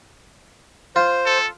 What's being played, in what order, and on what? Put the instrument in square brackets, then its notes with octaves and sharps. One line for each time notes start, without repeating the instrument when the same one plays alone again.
[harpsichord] F4 [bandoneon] C5
[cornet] A4